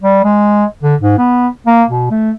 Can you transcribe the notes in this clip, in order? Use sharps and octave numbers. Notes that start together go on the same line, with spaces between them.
G3
G#3
D3
G#2
B3
A#3
B2
A3